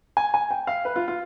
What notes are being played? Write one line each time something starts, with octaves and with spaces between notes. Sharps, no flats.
G#5
G#5
G5
F5
B4
F4
F4